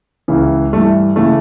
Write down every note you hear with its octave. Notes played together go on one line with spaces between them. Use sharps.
C#2 C#3 E3
G2 E3 A3
C#3 E3 A3